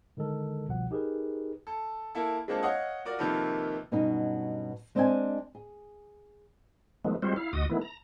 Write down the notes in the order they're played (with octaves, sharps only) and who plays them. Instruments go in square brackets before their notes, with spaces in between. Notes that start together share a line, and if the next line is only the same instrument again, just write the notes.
[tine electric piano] D3 D#3 G#3 A4 A#4
G1 C2 B2 F3 F#5
D#4 G4 G#4 A#4 B4
[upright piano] A4
A#3 E4 A4
G#3 A#3 C4 D4 F4 A4
C#5 D#5 F5 F#5 D#6
F4 F#4 A#4 D5
C3 D#3 F3 A#3 A4 B4
[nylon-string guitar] G2 B2 F#3 C#4 D#4
G#3 C4 D4 D#5 F5 G#5
G#4
[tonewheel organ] D#3 F3 G#3 A3 B3
G3 G#3 C4 F4 F#4 C5
E4 F5
D2 F#4 D#5 D#6
D#3 E3 A3 B3 E4
A#5